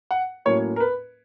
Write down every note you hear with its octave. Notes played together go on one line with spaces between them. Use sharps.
F#5
A2 F#3 A#3 C#4 C#5
A#4
B4